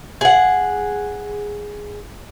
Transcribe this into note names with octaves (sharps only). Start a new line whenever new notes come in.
G#4 F#5